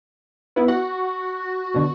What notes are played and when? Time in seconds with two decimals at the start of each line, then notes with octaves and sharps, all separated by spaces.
0.56 B3 E4
0.68 F#4 F#5
1.74 B2 D3